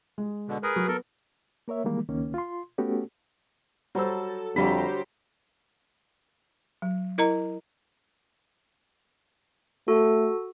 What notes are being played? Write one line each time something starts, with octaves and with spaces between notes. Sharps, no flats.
G#3
B2 D3
G#4 A#4 B4 D#6
F#3
B3 A4 A#4
A#3 A#4 C#5 E5
D#3 E3 G3 G#3 A#3
C#2 D#3 A#3 C#4
F4 C6
A3 B3 C#4 F#4 G4 A4
F#3 G3 A4 C5 E6
F2 D3 F#3 G3 G4 C5 A#5 B5
F#3
E4 A#4 D#5 A#5
A3 F#4 A4